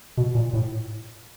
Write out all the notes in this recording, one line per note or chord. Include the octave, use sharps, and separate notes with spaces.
B2
A#2
A2